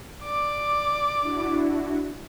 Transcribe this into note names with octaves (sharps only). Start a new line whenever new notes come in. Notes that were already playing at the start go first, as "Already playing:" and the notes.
D5 D6
D4 E4 F#4